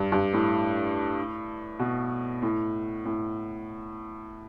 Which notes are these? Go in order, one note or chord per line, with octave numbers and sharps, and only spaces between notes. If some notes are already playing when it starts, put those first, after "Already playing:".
Already playing: G2
G2
A2
B2
A2
A2